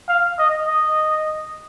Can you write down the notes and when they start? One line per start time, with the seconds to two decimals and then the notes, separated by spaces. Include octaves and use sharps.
0.09 F5
0.39 D#5
0.68 D#5